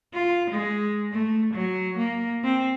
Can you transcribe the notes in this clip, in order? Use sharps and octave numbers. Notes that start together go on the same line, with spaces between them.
F4
G#3
A3
F#3
A#3
C4